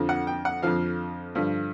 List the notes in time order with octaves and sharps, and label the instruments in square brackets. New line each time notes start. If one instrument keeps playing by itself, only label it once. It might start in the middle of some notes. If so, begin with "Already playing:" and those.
Already playing: [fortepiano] F2 D3 F3
F#5
G5
F#5
F2 D3 F3 F5
G2 D3 F3